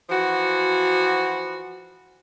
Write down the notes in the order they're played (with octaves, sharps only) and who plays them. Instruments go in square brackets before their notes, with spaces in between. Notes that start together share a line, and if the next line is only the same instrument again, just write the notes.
[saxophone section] E3 F3 F#4